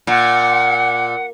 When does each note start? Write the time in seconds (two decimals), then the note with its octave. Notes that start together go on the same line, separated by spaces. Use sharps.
0.07 A#2 F#5